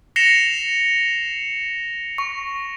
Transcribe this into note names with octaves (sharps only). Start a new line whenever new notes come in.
A#6 C7 C#7 E7 F7 G7
C#6